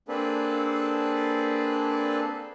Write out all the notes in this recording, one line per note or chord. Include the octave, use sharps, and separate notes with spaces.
A#3 C4 D4 G#4 A4 B4